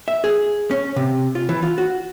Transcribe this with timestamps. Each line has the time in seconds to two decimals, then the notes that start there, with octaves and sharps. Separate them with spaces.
0.08 E5
0.24 G#4
0.71 C#4
0.96 C3
1.35 F4
1.49 E3
1.63 F4
1.78 F#4